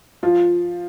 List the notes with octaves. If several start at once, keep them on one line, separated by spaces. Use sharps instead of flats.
F3 F4